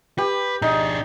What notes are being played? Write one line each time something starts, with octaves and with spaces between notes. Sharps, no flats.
G4 B4
D4 D#4 G#4